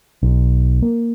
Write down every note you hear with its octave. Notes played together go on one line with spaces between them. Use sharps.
B1
A#3